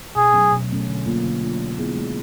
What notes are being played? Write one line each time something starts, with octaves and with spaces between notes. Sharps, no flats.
B2 G#4
F#3 A3 C#4
B2
F#3 A3 C#4
D3
F#3 A#3 D4 F4
D3
F#3 A#3 D4 F4
G#3
B3 E4 G#4
G#3